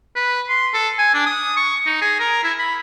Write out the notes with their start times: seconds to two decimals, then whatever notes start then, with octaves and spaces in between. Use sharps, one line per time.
0.15 B4
0.49 C6
0.74 A4
0.98 G#5
1.14 D4
1.26 D#6
1.57 C#6
1.86 D#4
2.01 G#4
2.20 A#4
2.43 E4
2.59 B5